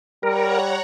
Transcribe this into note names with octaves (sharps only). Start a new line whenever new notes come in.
G3 A#4 C#5 F#5 A#5